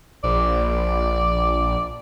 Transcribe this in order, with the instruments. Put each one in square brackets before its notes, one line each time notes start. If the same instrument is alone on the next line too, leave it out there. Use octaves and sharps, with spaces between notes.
[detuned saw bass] A#1 [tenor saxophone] D5